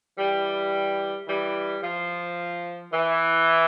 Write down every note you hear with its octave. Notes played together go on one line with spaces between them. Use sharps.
E3 G3
E3 G3
F3
E3